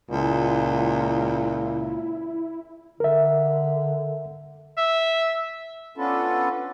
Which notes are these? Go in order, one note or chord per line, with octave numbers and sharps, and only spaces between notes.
C#2 A#2 E4
D3 A#4 E5
E5
B3 C#4 D4 F4 A4 B4